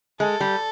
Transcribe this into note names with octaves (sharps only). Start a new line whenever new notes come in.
G#3 A4
G3